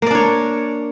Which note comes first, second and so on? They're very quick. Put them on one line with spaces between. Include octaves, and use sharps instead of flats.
A#3 D5 D4 C#5